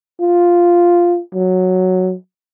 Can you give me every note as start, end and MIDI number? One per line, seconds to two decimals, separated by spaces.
0.21 1.20 65
1.35 2.15 54